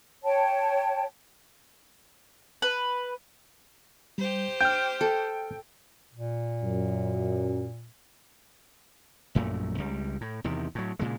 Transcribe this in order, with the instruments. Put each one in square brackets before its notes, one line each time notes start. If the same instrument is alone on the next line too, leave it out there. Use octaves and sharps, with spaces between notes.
[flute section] C#5 G5 A5
[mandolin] B4
[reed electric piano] G3 [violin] G4 C5
[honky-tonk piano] G5 [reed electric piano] F6 G6
[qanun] A4
[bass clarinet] A#2
[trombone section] F#2
[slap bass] A#1 F#2 A#2 A3
C#2 G3
A2
E2 C3 D#3
A2 F#3
A#2 C#3 G#3